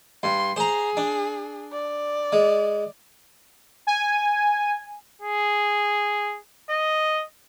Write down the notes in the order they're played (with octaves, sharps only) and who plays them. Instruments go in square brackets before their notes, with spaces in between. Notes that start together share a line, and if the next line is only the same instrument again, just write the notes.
[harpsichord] G2 [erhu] C6
[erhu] G#4 [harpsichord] C5 A#5
[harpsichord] D4
[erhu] D5
[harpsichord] G#3
[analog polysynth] G#5
[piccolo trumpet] G#4
D#5